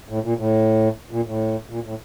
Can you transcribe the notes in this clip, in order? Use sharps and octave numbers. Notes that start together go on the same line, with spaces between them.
A2
A#2
A2
A#2
A2
A#2
A2